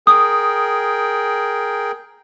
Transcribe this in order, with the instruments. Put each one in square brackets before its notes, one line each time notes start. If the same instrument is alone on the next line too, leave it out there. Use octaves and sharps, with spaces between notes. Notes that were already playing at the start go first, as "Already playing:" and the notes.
[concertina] G#4 A#4 G5 [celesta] D#6